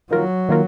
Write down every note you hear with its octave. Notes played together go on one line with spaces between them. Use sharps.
D#3 F#3 A#3 F4 A#4
D#3 A#3 F4 A#4